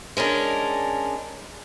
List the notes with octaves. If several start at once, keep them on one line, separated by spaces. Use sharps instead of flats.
G#3 C#4 D4 A#4